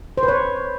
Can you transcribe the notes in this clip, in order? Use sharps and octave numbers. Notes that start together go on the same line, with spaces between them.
C5
B4
C#5